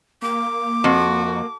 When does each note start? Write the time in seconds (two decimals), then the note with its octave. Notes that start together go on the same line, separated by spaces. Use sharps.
0.22 A#3 D6
0.84 F2 F#4